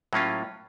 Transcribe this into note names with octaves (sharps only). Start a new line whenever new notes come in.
A2 F#3 A#3 C#4 F4